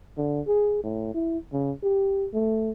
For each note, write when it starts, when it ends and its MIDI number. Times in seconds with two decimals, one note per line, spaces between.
0.18 0.41 50
0.48 0.81 68
0.83 1.13 45
1.14 1.38 64
1.53 1.72 49
1.83 2.27 67
2.34 2.71 57